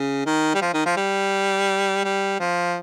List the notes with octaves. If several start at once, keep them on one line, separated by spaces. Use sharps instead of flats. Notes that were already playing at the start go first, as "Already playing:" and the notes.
Already playing: C#3
D#3
G3
F3
D#3
F3
G3
G3
F3